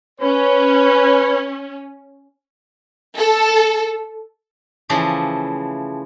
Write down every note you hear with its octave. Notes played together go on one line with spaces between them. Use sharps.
C#4 B4 C#5
A4
C#3 E3 F3 A3